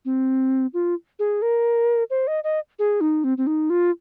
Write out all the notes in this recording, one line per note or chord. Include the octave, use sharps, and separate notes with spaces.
C4
F4
G#4
A#4
C5
D#5
D#5
G#4
D#4
C4
C4
D#4
F4